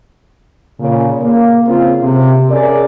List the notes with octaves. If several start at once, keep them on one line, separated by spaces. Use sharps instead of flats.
A#2 C#3
A#3
C#3 C4 F4
C3
C#4 G#4 A#4 D5